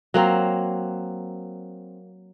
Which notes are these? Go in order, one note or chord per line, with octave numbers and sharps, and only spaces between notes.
F#3 A#3 C4